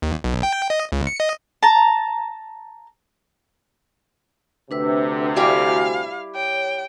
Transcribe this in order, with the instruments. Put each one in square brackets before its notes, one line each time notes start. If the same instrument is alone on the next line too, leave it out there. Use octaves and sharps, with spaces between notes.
[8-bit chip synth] D#2
B1
G5
D#5
C#2
C#7
D#5
[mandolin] A5 A#5
[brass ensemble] D2 C3 [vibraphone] D4 B4 E6
[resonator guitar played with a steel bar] G3 E4 G4 [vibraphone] F#4 G#5 [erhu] F5
[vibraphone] C#5 [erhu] G5